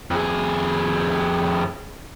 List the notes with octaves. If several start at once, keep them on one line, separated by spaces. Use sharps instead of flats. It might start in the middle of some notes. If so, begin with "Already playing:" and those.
F2 G#4